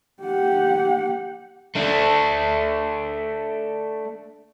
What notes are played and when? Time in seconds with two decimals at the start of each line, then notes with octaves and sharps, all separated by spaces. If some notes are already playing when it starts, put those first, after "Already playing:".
0.23 G4 F#5
1.75 A3 D4